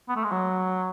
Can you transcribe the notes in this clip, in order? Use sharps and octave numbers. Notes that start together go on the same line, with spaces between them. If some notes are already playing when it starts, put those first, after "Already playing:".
B3
A3
G#3
F#3